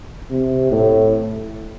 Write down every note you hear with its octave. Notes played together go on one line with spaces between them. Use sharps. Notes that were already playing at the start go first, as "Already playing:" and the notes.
C3
A2